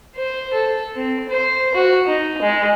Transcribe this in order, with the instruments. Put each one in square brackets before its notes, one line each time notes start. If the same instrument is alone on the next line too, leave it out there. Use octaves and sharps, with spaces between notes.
[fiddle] C5
A4
C4
C5
F#4
D#4
G#3